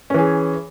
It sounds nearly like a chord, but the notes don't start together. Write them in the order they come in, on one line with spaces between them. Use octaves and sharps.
C#4 E3 G#4